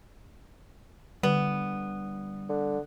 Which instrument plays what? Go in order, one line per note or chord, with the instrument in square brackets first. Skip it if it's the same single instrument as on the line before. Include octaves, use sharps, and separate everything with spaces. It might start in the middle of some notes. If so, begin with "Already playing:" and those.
[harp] D3 [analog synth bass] G3 [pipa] B3
[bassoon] D3 [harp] F#5